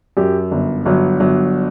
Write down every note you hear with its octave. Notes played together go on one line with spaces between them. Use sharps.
F#2 G4
G1
G1 F#3
G1 F#3